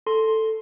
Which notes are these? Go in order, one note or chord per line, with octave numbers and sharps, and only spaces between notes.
A4 C6